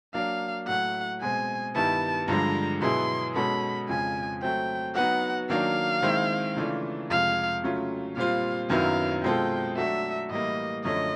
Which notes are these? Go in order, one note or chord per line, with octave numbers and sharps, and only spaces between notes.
F#3 A#3 D4 F5
A2 F#3 A3 F#5
B2 G#3 C4 G#5
G2 D#3 G3 B3 E4 A5
G2 D3 F3 G#3 A#5
B2 F#3 B3 E4 G#4 C6
B2 G#3 C#4 F#4 A4 B5
F2 C#3 F3 G#3 G#5
F#3 A3 C4 G5
F#3 B3 D#4 F#4 F#5
D#3 F#3 A#3 D4 F5
D#3 G#3 C4 E4
C#3 E3 A3 D4 F4
F2 C3 F3 G#3 F5
C#3 F#3 A3 C#4 F4
A#2 G3 C4 F4 F5
F#2 D#3 F#3 B3 E4 F5
B2 G#3 C4 F4 A4 G5
F#3 A3 D4 F#4 A4 E5
A2 E3 G3 A#3 D#5
F#2 D3 F3 A3 C#4 D#5